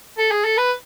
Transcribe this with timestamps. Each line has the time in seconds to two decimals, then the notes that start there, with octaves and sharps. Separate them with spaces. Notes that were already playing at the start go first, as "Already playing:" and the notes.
0.18 A4
0.31 G#4
0.45 A4
0.58 B4